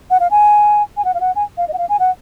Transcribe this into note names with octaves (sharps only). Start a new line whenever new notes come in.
F#5
F5
G#5
G#5
F#5
F5
F#5
G#5
F5
D#5
F#5
F5
G#5
F#5